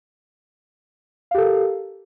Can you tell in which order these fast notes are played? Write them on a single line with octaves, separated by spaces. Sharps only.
F5 G4 A4 A#4